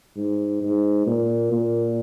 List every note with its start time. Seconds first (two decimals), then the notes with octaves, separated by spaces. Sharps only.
0.17 G#2
0.62 G#2
1.07 A#2
1.52 A#2